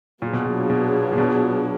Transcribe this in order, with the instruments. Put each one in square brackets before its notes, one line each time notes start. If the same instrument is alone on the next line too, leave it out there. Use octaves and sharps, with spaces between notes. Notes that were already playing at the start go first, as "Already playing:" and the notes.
[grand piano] A#2 [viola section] F#3 B3 D4 F4 G#4
[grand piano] B2
A#2
B2
A#2
B2